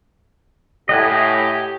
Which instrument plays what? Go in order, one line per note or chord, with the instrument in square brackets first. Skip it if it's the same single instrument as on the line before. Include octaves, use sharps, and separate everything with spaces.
[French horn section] A2 [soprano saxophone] G4 [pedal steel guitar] D#5 F#5 G#5